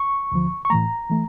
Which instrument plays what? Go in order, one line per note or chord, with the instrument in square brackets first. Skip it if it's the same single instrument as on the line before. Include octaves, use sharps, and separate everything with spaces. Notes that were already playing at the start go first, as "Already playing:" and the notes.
Already playing: [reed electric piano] C#6
D2 D3 F3
C#6
A2 E3 A3 A#5
E3 A3